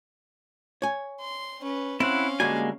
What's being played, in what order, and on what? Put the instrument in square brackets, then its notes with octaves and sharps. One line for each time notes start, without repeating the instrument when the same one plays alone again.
[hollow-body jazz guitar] C#5 G#5
[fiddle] C6
C#4 B4
[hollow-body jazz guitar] C4 [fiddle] C#4 F5 [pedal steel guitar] E4 F#5
[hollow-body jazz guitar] D3 G3 F#4 [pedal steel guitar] G#3 A#3 G#5